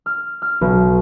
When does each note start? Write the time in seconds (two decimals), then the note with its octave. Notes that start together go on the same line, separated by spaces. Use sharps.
0.06 F6
0.42 F6
0.61 B1